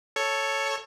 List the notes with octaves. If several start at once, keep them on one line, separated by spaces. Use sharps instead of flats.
A4 C#5 C#6